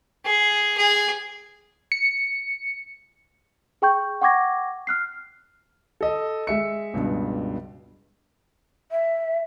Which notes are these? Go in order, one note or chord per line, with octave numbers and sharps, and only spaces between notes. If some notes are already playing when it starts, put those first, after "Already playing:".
G#4
G#4
C#7
G#4 G5 C#6 G6
F#5 G5 C#6 D6 G#6 A#6
F6 F#6 C7
A4 D#5
G#3 E5 C#7
C#2 G2 B2
E5